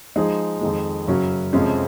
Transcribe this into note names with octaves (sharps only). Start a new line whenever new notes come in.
F3 G#3 D#4 G#4
F2 D#3 G#3
F#2 C#3 F#3 C#4 F#4
F2 C3 F3 G#3 C#4